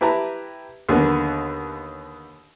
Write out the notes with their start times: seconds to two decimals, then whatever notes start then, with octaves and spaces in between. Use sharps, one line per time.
0.01 E4 G4 B4 E5 A5 A#5
0.89 D#2 D3 A#3 B3